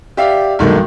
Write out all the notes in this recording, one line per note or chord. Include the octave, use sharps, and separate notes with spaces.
G4 D5 E5 F5
B1 G2 D#3 G#3 A3